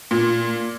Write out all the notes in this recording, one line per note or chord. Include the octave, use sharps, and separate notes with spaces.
A#2